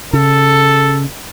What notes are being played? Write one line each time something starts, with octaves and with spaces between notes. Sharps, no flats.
C#3 A4